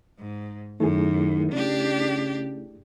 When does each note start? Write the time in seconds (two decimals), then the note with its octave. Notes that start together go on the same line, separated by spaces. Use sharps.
0.18 G#2
0.80 F#2 D#3 A3 E4 G#4
1.52 C#3 D4 G4